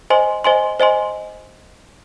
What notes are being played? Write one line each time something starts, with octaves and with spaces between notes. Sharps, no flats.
C5 D#5 G#5 C6
C5 D#5 G#5 C6
C5 D#5 G#5 C6